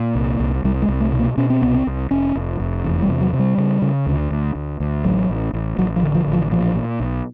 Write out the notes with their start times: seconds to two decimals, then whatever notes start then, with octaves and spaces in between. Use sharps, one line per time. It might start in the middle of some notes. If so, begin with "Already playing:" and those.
Already playing: A#2
0.15 C2
0.40 C2
0.64 C2 G3
0.82 G#3
0.88 C2
1.01 A3
1.13 B2
1.19 A#3
1.37 B2 C#4
1.50 C4
1.62 C2 B3
1.74 C4
1.87 C2
2.11 F1 C#4
2.35 F1
2.60 F1
2.84 E2
3.02 G3
3.09 C3
3.21 F#3
3.33 C3
3.39 G3
3.58 C#3
3.82 C#3
4.06 D2
4.31 D2
4.55 D2
4.80 D2
5.04 A1 F#3
5.29 A1
5.53 A1
5.78 A1 F#3
5.96 F3
6.02 D3
6.15 F3
6.27 A1
6.33 F3
6.51 A#2 F3
6.76 A#2
7.00 B1